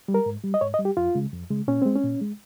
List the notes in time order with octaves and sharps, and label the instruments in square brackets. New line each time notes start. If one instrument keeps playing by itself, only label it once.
[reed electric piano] G3
A#4
G#2
G3
D#5
G#2 C#5
D#5
G3
G4
F2 F4
C#3 G#3
F2
C#3 G#3
A#2 C#4
G#3 C4
C#4
A#2
G#3